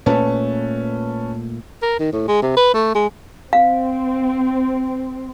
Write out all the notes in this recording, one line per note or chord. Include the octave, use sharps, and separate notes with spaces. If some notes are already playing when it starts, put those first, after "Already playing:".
A#2 A3 C#4 B4 A5
A#4
D#3
A2
G#3
C3
B4
A3
G#3
C4 F5